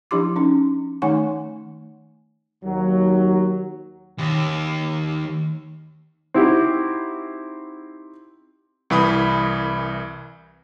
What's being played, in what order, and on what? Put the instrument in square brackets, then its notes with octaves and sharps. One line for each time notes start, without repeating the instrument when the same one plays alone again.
[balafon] F3 D4 E4 G4 C6 D6
C#4 D#4
D#3 A3 D#4 F#5 G#5 C#6
[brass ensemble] D#2 F#3
[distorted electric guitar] D#2
[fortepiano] C4 D#4 E4 F#4 G4
[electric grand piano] C2 E3 B5 D#6